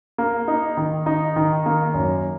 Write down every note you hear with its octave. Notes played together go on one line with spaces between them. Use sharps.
A#3
D#4
D#3
D#4
D#3
A#3
F#2